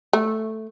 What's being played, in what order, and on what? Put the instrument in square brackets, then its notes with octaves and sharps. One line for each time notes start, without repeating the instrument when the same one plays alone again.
[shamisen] A3